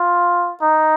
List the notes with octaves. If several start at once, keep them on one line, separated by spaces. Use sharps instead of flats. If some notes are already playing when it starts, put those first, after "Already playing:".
Already playing: F4
D#4